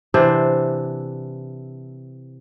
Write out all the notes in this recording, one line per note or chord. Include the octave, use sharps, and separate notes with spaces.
C3 E3 D4 C5